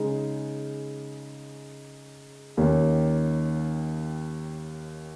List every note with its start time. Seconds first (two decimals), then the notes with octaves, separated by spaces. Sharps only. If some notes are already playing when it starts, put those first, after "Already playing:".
Already playing: C#3 G#3 D#4
2.57 D#2 D#3 A#3 C#4